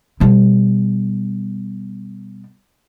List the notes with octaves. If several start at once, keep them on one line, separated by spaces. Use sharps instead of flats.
B2 G3